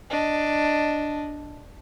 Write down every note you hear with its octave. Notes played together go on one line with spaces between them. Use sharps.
D4 D#5